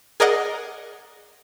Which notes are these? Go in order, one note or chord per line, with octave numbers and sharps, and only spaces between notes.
G#4 A#4 D5 D#5 F#5